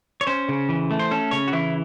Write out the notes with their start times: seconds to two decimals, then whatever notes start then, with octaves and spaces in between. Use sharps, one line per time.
0.21 C#5
0.27 C#4 C5
0.49 C#3
0.69 E3
0.91 A3
1.00 C5
1.11 C#4 A4
1.31 C#3 C#5
1.48 F#4
1.53 E3 E4